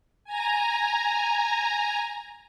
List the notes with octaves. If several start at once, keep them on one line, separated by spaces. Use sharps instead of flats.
G#5 A#5